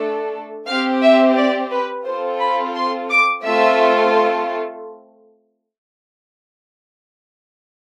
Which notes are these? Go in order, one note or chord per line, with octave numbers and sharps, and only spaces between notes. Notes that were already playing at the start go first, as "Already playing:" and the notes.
Already playing: A3 D4 A4
C4 G4 F5
E5
D5
B4
C4 F4 A4 C5
B5
C6
D6
A3 C4 F4 A4 E5